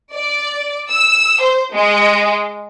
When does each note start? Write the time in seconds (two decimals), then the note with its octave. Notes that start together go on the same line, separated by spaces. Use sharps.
0.14 D5
0.90 E6
1.42 C5
1.73 G#3